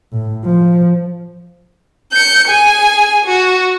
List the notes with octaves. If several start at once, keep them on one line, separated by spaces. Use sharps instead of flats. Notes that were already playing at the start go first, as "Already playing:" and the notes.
A2
F3
G6 C#7
G#4 G#5
F#4